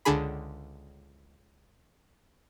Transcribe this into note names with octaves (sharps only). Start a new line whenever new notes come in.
C#2 D3 D4 G#4 B5